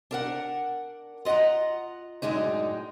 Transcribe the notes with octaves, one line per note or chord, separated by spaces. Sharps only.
D4 A#4 F#5
F4 D#5 F5 F#5 A#5
F#2 A2 G#3 D4 D#4